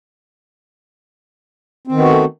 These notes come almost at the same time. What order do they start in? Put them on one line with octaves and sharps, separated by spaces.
C4 D#3 B3 F#4 A3